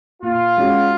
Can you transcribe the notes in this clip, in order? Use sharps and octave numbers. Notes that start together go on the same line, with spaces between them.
A#2 F4
G#3 C#4 F#4